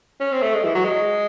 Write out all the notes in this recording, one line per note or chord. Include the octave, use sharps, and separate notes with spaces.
C#4
C4
A3
G#3
E3
F#3
G#3